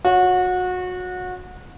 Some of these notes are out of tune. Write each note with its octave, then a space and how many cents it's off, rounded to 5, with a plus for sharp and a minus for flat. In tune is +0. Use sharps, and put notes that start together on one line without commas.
F#4 -25 C#5 +10